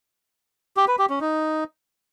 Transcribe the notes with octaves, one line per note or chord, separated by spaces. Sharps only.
G4
B4
G4
C#4
D#4